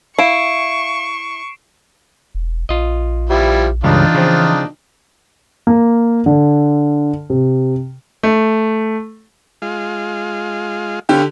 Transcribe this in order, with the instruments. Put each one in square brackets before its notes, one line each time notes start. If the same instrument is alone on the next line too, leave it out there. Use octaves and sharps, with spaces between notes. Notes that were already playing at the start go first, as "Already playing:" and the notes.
[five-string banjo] E4 [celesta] F5 [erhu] C#6 [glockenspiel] C7 D7 E7
[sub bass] E1
[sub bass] A#1 [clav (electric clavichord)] F4 D#5
[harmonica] F3 G3 E4
[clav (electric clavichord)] C#2 G2 C#3 [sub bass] E3 [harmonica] D4 D#4 F4
[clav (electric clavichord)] C#3 F3 C4
[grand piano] A#3
D3
C3
[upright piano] A3
[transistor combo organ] G#3 F4
[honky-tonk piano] D3 G4 [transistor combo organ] B3 C#4 F5